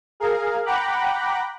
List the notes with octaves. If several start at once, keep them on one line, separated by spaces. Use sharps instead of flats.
G#4 A#4 F5
F#5 G5 A#5 B5 D6 F#6